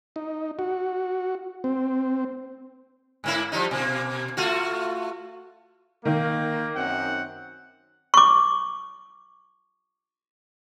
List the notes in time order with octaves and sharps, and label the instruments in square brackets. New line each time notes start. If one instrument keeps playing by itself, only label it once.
[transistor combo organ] D#4
F#4
C4
[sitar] G#2 A#3 E4
F3 G3 D#4
B2 A#3
A3 F4 F#4
[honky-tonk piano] D#3 [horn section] A#3
[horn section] F#2 C4 F#5
[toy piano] C#6 D6